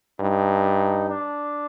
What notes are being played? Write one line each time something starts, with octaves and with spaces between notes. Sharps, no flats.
G2 D#4
D4